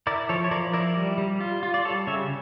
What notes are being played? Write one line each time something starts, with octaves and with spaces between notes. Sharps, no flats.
E4 A#4 D5
F3 A4 C#5
C#5
F3 A#4 D5
E4 A#4 D5
G3
G3
F4
F4
D5
G3 A4 C#5
C#3 C#5 E5